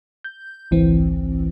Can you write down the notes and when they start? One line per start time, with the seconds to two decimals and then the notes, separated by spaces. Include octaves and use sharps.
0.24 G6
0.71 G#1 C#2 E3 C4